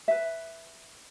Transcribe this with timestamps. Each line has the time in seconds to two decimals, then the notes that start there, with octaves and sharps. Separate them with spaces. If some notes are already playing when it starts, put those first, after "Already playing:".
0.08 B4 E5